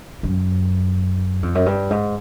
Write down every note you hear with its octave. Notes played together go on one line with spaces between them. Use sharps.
F#2
F2
F#2
G2
G#2